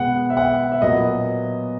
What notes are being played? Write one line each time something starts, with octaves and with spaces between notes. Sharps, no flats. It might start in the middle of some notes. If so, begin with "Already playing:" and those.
Already playing: B2 G#3 B3 F#5
E5
F#5
E5
A#2 F#3 B3 D#5